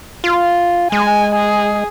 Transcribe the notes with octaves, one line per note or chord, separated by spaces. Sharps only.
F4
G#3 G#5
G#4